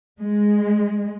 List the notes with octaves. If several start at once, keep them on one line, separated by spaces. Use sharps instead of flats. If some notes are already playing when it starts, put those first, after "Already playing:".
G#3